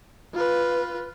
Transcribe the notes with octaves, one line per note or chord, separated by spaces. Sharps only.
F4 B4